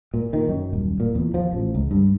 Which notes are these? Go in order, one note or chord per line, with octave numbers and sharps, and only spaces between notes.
A#2
D#3
F#2
D#1
A#2
E2
F3
A1
C#2
G2